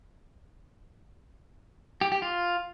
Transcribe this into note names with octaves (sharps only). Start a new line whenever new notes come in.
G4
G4
F4